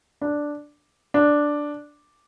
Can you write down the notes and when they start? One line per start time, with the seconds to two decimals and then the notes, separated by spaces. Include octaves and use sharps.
0.21 D4
1.14 D4